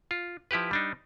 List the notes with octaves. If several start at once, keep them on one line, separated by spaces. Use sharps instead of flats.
F4
F3 E4 G4 B4
G3 D4 D#4